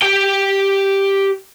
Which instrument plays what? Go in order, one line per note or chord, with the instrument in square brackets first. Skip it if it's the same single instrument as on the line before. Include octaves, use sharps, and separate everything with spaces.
[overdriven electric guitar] G4 G5